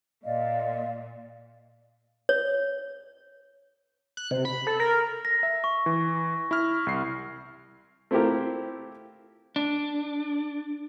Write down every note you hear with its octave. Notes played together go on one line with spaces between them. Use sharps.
A#2 D5 D#5 F5
C#5
F#6
C3
B5
A4
A#4
A#6
E5
C#6
E3
E4 F6
C2 C7
A3 C4 E4 F4 G4 A#4
D4